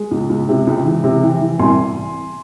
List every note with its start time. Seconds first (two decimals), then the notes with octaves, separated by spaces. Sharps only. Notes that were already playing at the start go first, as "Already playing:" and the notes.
Already playing: G#3
0.11 C#2
0.29 C#2
0.49 C3
0.67 C#2
0.85 E3
1.04 C3
1.23 E3
1.41 E3
1.59 C2 G#5 C6